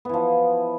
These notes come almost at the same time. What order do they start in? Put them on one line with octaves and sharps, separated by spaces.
B3 E3 F3